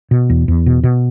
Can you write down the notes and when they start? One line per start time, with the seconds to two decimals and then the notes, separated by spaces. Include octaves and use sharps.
0.11 B2
0.30 E2
0.48 E2
0.66 B2
0.83 B2